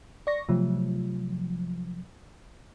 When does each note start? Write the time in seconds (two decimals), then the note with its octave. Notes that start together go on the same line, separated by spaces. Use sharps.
0.27 D5 C#6 A#6
0.49 C3 F3 F#3 A3